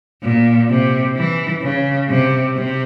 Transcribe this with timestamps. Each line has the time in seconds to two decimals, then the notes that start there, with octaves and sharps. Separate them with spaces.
0.23 A#2
0.70 C3
1.16 E3
1.62 C#3
2.09 C3
2.55 C3